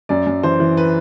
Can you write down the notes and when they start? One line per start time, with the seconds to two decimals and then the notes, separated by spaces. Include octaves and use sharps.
0.09 F#2 D5
0.27 F#2
0.43 E3 C5
0.60 E3
0.77 B4